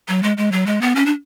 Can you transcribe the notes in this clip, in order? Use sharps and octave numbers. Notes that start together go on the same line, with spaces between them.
F#3
G#3
G#3
F#3
G#3
B3
C#4
D4